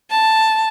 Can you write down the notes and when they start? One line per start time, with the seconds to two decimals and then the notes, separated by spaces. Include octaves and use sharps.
0.11 A5